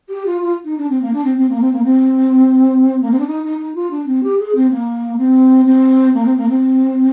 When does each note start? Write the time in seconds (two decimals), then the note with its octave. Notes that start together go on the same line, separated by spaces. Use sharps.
0.09 G4
0.26 F4
0.41 F4
0.65 D#4
0.78 D4
0.90 C4
1.02 A#3
1.13 D4
1.24 C4
1.37 C4
1.49 A#3
1.61 C4
1.73 A#3
1.84 C4
3.02 A#3
3.11 C4
3.19 D4
3.27 D#4
3.44 D#4
3.59 D#4
3.75 F4
3.91 D4
4.06 C4
4.23 G4
4.39 G#4
4.55 C4
4.71 A#3
5.18 C4
5.66 C4
6.14 A#3
6.25 C4
6.37 A#3
6.49 C4